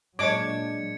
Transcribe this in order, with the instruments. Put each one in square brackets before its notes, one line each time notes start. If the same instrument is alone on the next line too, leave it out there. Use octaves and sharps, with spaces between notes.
[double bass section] A#2 F#3 [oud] G#3 D4 [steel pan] C#5 D6 [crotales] G#6 C#7